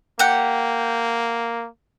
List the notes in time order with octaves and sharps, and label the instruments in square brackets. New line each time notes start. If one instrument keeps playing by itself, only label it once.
[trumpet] A#3 [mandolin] G4 F#5